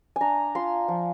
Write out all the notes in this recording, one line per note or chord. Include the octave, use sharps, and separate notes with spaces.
D4 G#5 A#5
F4 C6
F3